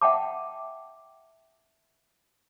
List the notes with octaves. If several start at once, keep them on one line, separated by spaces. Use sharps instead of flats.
E5 F#5 G5 A5 D6